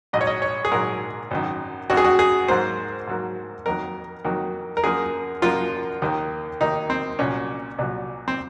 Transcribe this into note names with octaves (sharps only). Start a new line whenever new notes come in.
A#1 G#2 F#3 D#5
C#5
D#5
C#5
G#4
A#1 G#2 F#3 A#4
G#1 F#2 D#3
G#1 F#2 D#3 F#4
G#4
F#4
G#4
G#2 F#3 A#3 C5
G#2 F#3 A#3
F2 D#3 F#3 A#3 A#4
F2 D#3 F#3 A#3
A#4
F#2 F3 A#3 G#4
F#2 F3 A#3 F4
D#2 D#3 A#3
D#2 D#3 A#3 D#4
C4
C2 A#2 F#3 C#4
C2 A#2 F#3
C4